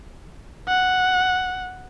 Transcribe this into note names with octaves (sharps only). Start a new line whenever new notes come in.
F#5